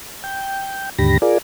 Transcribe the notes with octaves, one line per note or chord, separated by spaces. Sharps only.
G5
D#2 G#2 D3 G4 B5 A#6
F4 G#4 A#4 D5